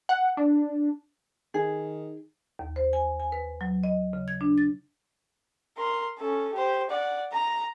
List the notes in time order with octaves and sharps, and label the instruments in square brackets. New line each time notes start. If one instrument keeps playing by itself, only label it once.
[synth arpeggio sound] F#5
D4
[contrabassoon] D#3 [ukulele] G#4
[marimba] D#2
C5
G#5
G#5
B4
F#3
D#5
C#3
G#6
D4
A6
[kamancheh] A#4 C6
C#4 A4
G4 C5
D5 F#5
A#5